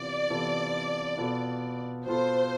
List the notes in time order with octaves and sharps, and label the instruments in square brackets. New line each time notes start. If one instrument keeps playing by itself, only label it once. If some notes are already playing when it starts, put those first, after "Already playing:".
Already playing: [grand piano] C3 E3 B3 F4 [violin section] D5
[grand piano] C3 E3 B3 F4 A4
B2 B3 F4 A4
[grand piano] B2 B3 F4 A4 [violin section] C5